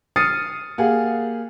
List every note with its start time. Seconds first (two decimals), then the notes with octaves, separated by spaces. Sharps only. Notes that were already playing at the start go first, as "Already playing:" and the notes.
0.16 D#6 F6 A6 C7 C#7 D#7
0.78 A#3 G4 G#4 F5 F#5